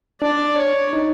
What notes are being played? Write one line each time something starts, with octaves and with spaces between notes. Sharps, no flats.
D4 D5
C#5
D#4